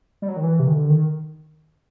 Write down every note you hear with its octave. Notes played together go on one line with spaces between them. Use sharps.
G3
F#3
D#3
E3
C3
D#3
D3
D#3